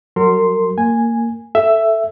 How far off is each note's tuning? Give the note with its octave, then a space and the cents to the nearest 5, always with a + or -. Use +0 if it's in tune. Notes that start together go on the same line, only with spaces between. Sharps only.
F#3 +10 A#4 -35 C6 +0
A#3 -15 G#5 -5
A4 +0 E5 +10